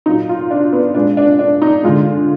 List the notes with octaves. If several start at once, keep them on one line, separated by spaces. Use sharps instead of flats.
A#2 F#3 D#4
F4
D4
B3
A#2 G#3 D4
D4
D4
D#4
D3 G#3 F4